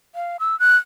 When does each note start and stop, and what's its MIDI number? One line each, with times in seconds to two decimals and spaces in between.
0.15 0.37 77
0.40 0.58 88
0.60 0.76 90